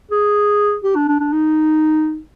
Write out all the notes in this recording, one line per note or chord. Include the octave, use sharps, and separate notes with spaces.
G#4
G4
D4
D4
D4
D#4